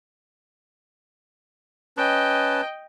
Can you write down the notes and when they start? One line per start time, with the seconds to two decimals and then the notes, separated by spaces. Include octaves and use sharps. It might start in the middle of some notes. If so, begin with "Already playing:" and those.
1.97 C#4 B4 D#5 G5 A5